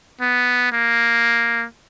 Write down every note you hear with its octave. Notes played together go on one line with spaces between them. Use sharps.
B3
A#3